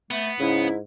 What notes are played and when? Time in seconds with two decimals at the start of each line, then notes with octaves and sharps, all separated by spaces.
0.11 A3 B3
0.40 G#2 C#3 E4